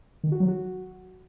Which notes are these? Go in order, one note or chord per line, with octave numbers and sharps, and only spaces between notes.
D#3
F#4
F#3
F#4